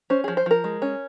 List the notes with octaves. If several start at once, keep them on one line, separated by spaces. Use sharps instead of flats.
C#4 C5
F3 G#4
C5
F3 A#4
G#3
C#4